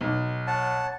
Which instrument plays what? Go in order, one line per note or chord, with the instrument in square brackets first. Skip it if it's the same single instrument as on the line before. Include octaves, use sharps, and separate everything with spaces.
[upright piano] B1
[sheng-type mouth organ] C#5 F#5 [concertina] A5